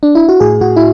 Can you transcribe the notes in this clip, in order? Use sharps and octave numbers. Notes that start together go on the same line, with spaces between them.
D4
E4
F#4
A2 G#4
A2 F#4
E4